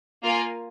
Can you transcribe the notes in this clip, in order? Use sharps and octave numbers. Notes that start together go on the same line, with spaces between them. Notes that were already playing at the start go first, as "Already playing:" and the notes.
A#3 F4 A#4 F5 G#5